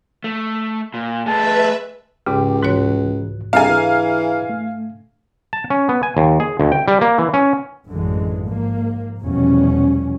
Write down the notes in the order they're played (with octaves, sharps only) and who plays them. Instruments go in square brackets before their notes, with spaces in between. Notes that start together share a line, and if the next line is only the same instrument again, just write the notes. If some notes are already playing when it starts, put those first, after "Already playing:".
[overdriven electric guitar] A3
A#2
[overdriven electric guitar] A3 G#4 [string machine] B4 E5 [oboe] A5
[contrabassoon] C#2 [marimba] G#2 C#3 [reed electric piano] G4 G5 D6
[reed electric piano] C2 E3 F#6 [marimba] G#2 F#4 C#5
[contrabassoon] C2 [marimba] D4 A4 [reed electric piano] G#4 E5 A#5 [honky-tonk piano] F5 G#5
[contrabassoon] E3
[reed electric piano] A3
[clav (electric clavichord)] A5
C#4
B3
G#5
D#2
G#4
D2
G5
G3
A#3
E3
C#4
[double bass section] A1 F#2 D3 E3 G#3
G#2 F3 A#3
F1 E2 B2 F3 G3 C#4